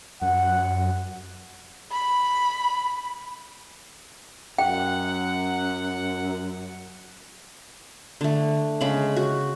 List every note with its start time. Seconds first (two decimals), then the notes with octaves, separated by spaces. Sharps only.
0.22 F#2 F#5
1.92 B5
4.58 F#2 F#5 G5
8.21 D3 A3
8.81 C#3 G#3 B5
9.16 F#4